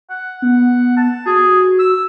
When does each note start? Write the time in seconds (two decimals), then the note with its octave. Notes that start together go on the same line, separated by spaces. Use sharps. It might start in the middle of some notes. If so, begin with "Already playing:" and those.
0.10 F#5
0.42 B3
0.97 A5
1.26 F#4 G#4
1.79 E6